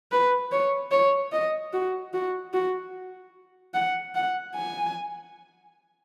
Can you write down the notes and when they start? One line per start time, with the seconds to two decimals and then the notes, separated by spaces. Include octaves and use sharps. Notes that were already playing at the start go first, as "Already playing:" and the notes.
0.12 B4
0.51 C#5
0.91 C#5
1.32 D#5
1.73 F#4
2.14 F#4
2.53 F#4
3.74 F#5
4.15 F#5
4.55 G#5